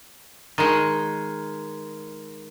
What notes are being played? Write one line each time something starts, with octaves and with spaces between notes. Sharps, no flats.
D#3 G#3